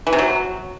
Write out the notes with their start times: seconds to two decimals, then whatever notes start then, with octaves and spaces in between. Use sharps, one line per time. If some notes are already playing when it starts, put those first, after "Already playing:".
0.07 E3
0.13 C3
0.19 F#3